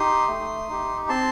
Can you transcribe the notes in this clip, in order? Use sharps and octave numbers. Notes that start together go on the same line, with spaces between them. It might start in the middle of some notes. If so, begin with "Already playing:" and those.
Already playing: D#4 G4 C6 D#6
A3
D#4 G4
C4 A5 C6